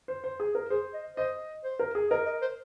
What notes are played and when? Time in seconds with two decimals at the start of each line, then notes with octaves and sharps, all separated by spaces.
0.08 C5
0.24 C5
0.40 G#4
0.55 A#4
0.70 G#4 C5
0.94 D#5
1.17 C5 D#5
1.64 C5
1.79 A#4
1.95 G#4
2.11 A#4 D#5
2.26 D#5
2.42 C5